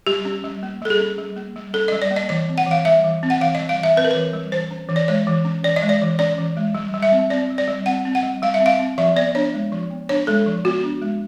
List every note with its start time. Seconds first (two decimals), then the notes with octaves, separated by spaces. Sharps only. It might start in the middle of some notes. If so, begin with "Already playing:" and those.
0.07 G3 G4
0.25 C#4
0.44 G3
0.63 A#3
0.82 G3 A4
0.90 G#4
1.00 C#4
1.18 G3
1.36 A#3
1.56 G3
1.74 C#4 A4
1.88 G3 D#5
2.02 D5
2.11 A#3
2.16 D#5
2.29 E3 D#5
2.49 C4
2.58 F#5
2.67 E3 F5
2.85 G3 E5
3.04 E3
3.23 C4
3.30 F#5
3.41 E3 F5
3.55 G3 D#5
3.69 F5
3.79 E3 E5
3.96 C4 B4
4.05 A#4
4.11 E3 B4
4.33 G3
4.52 E3 C5
4.71 C#4
4.89 E3
4.96 D5
5.08 G#3 C#5
5.27 E3
5.45 C#4
5.64 E3 D5
5.76 D#5
5.82 G#3
5.89 D5
6.02 E3
6.19 C#4 D5
6.38 E3
6.57 G#3
6.75 G3
6.94 G3
7.02 E5
7.12 C4
7.30 C4 D5
7.50 G3
7.58 D5
7.67 G3
7.86 C4 F#5
8.05 C4
8.15 F#5
8.23 G3
8.42 G3 F5
8.54 E5
8.60 C4
8.66 F5
8.79 C4
8.98 F3 E5
9.16 B3 D5
9.35 D4 C#5
9.54 G#3
9.72 F3
9.91 B3
10.09 D4 C#5
10.27 G#3 A4
10.46 F3
10.65 B3 F#4
10.84 D4
11.02 G#3